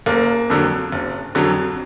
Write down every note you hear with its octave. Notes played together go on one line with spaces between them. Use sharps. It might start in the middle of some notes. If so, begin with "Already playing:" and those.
F#1 A#3
F2 D3 F#3
F#1
F2 D3 F#3